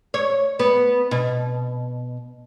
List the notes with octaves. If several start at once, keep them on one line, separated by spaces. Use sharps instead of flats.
C#5
B3
B2